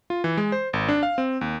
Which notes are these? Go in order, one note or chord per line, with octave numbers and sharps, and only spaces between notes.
F4
E3
G#3
C5
G#1
D4
F5
C4
D#2